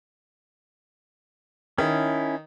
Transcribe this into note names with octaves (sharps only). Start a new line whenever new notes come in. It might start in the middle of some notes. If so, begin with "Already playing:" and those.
D#3 C#4 E4